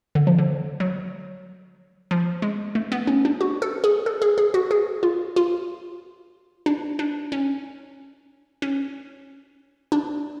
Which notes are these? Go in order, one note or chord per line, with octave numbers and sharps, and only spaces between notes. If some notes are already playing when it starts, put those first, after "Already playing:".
D3
F3
D3
F#3
F3
G#3
A3
B3
C#4
D4
F#4
A4
G#4
A4
G#4
G#4
F#4
G#4
F4
F4
D4
D4
C#4
C#4
D4